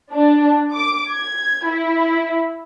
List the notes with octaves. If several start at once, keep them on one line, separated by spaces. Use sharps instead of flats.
D4
D6
G#6
E4